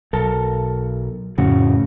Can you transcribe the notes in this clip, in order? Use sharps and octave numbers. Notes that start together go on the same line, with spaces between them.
B1 A4 A#4 A5
F2 A2 C#3 F#4